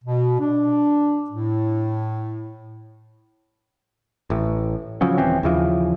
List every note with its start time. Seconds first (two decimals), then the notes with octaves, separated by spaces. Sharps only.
0.04 B2
0.40 D4
1.30 A2
4.30 A1 A2
5.01 C#3 F3 F#3 C#4
5.18 D#1 E3 C4 C#4
5.43 D#2 C#3 E3 F3